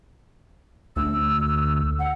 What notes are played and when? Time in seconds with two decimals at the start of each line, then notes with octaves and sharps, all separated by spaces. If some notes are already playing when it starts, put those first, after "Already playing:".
0.96 D2 E6
1.99 F#5